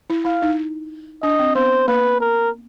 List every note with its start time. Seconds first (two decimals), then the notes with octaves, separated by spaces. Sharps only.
0.10 E4
0.25 E4 F5
0.42 D#4
1.23 D4 D#5
1.39 C4
1.55 B3 C5
1.88 A#3 B4
2.21 A#4